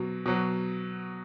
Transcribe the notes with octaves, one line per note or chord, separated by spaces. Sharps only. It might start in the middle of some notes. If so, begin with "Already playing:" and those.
Already playing: B2 F#3
B2 F#3